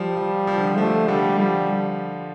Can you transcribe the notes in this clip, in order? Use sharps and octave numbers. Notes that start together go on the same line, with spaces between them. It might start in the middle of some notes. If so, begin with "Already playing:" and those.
Already playing: F3 G3
F3
F3
D3
F3
F3 A3
D3 G3
F3 G3